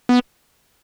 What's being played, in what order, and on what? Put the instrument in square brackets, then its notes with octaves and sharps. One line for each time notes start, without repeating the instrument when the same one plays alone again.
[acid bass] B3